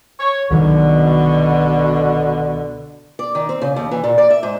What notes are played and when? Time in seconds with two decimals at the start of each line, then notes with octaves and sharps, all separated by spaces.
0.20 C#5
0.50 C2 B2 D3 D#3 F#3
3.19 D5
3.35 D#3
3.49 C4
3.62 C#3
3.76 D#2
3.91 E3
4.04 A#2
4.18 D5
4.30 E5
4.43 G#2